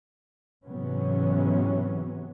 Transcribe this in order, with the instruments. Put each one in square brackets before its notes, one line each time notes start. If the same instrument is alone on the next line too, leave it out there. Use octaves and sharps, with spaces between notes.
[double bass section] G#2 C3 E3 F#3 B3 C#4